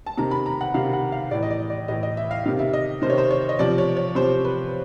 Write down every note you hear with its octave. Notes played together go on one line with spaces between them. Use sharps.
A5
C3 D#3 A#5
B5
A#5
F#5
C3 D#3 F5
F#5
F5
A2 E3 D5
D#5
D5
D5
A2 E3 D#5
D#5
E5
F5
C3 D#3 F5
E5
D#5
C3 D#3 C5 C#5
C5
C#5
D#5
C3 F3 D5
C#5
C#5
C3 F3 C5
B4